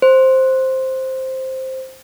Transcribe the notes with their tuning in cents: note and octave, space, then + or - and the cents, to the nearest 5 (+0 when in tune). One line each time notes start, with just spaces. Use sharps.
C5 +5